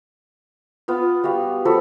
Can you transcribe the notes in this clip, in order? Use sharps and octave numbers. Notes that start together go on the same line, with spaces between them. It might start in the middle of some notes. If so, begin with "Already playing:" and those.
B3 F4
G3 F#4 F5
F3 F#4 A4 B4